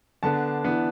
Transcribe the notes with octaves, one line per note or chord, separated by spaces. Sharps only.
D3 B3 D4 A5
E3 B3 D4